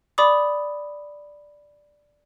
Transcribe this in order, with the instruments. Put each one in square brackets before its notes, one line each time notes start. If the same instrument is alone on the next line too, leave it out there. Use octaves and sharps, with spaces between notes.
[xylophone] D5 B5 D6 D#6